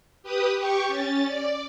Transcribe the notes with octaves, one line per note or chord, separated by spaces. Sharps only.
G4 B4 D#6
G4 G5 C#6
C#4 A6
D5